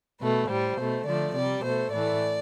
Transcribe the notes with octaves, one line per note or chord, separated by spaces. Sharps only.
B2 A3 B4
A2 G3 C5
B2 A3
D3 F3 A3 D5
C3 G3 D5
B2 A3 C5
A2 E3 A3 D5